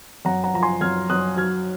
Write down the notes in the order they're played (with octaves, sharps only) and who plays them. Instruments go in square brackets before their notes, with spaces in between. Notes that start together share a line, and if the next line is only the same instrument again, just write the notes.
[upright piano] F#2 F#5 A#5
F#5 A#5
F3 A#5
G#5 C6
F#2 F6 G#6
F#2 D#6 F#6
F#3 F6 G#6